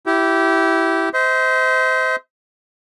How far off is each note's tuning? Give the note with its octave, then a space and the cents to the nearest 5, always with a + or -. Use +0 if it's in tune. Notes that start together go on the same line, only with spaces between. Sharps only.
E4 +0 G4 -20
C5 -20 D#5 +45